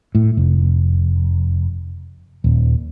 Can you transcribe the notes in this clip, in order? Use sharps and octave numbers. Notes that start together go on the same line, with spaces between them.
A2
F1
D#1